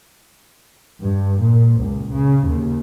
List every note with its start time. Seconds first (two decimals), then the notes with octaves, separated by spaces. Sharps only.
1.01 G2
1.41 A#2
1.80 C#2
2.13 C#3
2.47 D#2